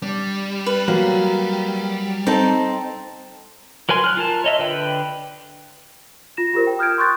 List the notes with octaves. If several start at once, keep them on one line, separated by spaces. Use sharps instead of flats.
G3 D4
B4
F#3 A#3
C4 D#4 A4 A5
F#3 A#4 B4 G#5 C6
F6 F#6
F4 A#4 A5
C#5 D#5 E5
D3 B4 G5
F4 A#6 E7
F4 G4 A#4 C5
G5
D#6 F6 G6 G#6 D7
C6 C#6 D#6 F#6 G6 A6